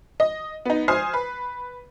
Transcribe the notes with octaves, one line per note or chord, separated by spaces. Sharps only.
D#5
B3 D#4
C5 G#5 D#6 F6 C7
B4